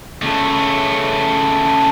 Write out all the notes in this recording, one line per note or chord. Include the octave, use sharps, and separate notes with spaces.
C#3 A3